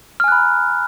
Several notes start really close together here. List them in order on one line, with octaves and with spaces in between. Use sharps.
F6 G#5 F#6 B5 A#5